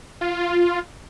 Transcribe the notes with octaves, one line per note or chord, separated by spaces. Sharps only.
F4